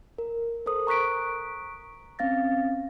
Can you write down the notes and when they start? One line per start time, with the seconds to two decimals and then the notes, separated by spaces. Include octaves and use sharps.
0.18 A#4
0.66 A4 A#4 C5 D#6
0.87 A#5 C#6 F#6 B6 D7
2.19 C4 C#4 F5 A6 A#6